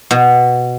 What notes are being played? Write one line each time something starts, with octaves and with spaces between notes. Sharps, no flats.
B2